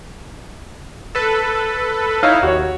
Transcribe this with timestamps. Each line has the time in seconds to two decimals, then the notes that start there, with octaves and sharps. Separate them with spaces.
1.15 A4 B4
2.23 D#4 E4 C#5 F5
2.43 D#2 F#4 C#5